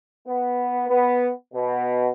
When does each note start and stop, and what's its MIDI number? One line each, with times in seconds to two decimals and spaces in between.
0.27 0.85 59
0.89 1.30 59
1.53 2.10 47